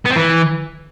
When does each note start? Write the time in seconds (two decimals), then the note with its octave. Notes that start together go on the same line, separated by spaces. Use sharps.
0.06 B3
0.11 C4
0.16 E3